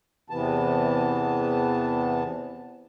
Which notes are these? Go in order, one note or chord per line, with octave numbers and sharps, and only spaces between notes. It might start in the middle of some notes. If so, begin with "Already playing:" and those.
E2 C3 E3 B3 A5